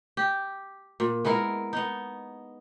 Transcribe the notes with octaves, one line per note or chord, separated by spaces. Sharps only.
G4
A#2
G#3 B3 E4 A#4
B3 D#4